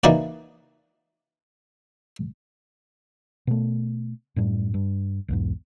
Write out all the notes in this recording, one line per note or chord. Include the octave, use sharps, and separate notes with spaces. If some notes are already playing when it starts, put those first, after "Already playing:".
E3 A#3 D#4 F#4 D5
B2 A3
F#2 A2 G3
G2
B1 E2 G#2